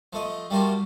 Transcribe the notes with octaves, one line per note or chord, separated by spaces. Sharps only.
F3 A3 D#5
G3 A3 A#3 F4 F#4